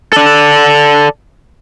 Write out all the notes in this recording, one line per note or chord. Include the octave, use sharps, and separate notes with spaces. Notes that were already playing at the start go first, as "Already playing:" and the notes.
A4 D5